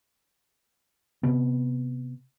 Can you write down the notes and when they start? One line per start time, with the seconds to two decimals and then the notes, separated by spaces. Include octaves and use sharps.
1.23 C3 B3